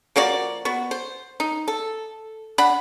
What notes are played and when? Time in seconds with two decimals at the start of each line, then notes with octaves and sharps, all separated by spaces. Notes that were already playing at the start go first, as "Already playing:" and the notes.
0.16 F3 A#3 F#4 D5
0.65 B3 F#4
0.91 C5
1.40 D#4
1.68 A4
2.58 D4 F#5 B5